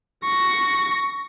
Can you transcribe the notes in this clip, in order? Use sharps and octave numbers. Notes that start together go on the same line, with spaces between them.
C#6 A#6